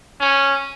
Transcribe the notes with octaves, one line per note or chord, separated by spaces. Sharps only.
C#4